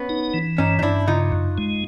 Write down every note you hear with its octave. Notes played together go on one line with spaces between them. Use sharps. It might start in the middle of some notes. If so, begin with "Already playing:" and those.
Already playing: B3 C#4
D#4
E3
G2 C#4 D#4
D#4
G2 D4 E4
C#3 D#4 F4
F#2
G#3